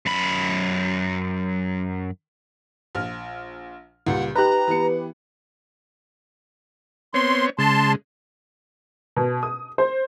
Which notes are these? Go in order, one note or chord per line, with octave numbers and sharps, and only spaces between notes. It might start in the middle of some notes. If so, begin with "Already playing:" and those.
F#2 B5
A#1 F6
C#2 A#2 G3 F#5
D#4 G4 B4 A#5 F#6
E3 B3 C#7
B3 C4 C#5 C6
C#3 G#3 A5 C6
B2
D#6
C5